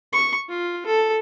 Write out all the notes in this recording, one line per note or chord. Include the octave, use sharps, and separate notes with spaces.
C#6
F4
A4